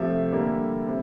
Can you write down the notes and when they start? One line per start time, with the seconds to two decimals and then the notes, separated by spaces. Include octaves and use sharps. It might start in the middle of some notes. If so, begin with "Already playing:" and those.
Already playing: C3 F3 A3 E5
0.32 D3 G3 A#3
0.87 C3